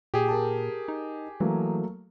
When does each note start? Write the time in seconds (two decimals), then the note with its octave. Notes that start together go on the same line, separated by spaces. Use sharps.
0.14 A#2 G4 G#4
0.29 A#4 A5
0.88 D#4
1.40 E3 F#3 A3 A#3